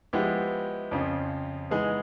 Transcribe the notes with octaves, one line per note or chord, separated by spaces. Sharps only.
F3 G#3 B3 E4 G4
F2 C#3 F3
E3 G#3 B3 D#4 G#4